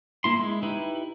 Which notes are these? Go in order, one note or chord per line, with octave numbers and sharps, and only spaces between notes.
A#3 E4 C6
G#3 E4
D#4 E4 G4 B4